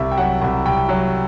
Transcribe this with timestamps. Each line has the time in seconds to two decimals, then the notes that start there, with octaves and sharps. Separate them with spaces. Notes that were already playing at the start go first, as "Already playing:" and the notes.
Already playing: C2 E5
0.11 G5
0.18 F#3 F#5
0.41 C2 F#5
0.65 C2 G5
0.89 F#3